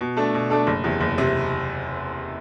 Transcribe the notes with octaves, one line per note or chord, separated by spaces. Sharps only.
B2
A3 D4 A4
B2
A3 D4 A4
F#1
E2 C3
F#1
C3